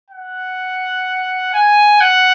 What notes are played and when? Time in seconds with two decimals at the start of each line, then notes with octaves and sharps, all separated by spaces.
0.11 F#5
1.54 G#5
2.01 F#5